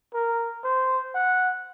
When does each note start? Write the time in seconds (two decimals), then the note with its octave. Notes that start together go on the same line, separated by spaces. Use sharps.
0.14 A#4
0.64 C5
1.15 F#5